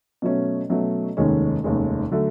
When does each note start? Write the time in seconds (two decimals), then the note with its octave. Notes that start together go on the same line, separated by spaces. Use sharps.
0.22 B2 F#3 A3 C#4
0.70 B2 F#3 A3 C#4
1.17 F1 D#2 D#3 G#3 C#4
1.64 F1 D#2 D#3 G#3 C#4
2.11 D3 F#3 A3